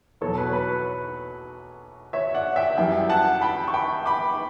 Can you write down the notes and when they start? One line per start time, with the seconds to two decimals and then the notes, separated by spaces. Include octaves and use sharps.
0.21 E2 B2 F#3 A4 C#5
0.38 B4
0.49 C#5
0.53 B4
2.13 C#5 E5
2.35 D5 F#5
2.56 E5 G5
2.77 F#2 E3 G3 E5 G5
3.09 F#5 A5
3.42 G5 B5
3.68 C#6
3.74 G5 B5
4.06 B5 D6